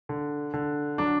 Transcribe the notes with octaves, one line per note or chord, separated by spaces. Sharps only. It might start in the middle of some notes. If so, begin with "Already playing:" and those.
D3
D3
F#3 D4